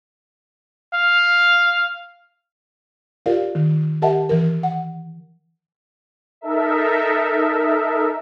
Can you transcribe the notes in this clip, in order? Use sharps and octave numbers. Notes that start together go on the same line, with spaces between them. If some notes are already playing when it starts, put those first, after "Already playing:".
F5
F4 G4 A#4 D5 F5
D#3
G4 A#4 D#5 E5 F#5 A5
E3 A#4
F#5
D#4 A4 A#4 E5